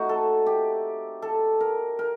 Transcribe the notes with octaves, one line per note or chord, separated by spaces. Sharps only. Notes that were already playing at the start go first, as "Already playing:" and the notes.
Already playing: A3 C4 D#4 F#4
A4
G4
A4
A#4
A#4